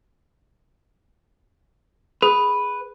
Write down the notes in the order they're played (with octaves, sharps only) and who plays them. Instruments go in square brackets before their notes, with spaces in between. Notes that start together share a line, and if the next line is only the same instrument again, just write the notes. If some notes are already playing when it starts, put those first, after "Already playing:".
[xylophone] G#4 [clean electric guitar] B4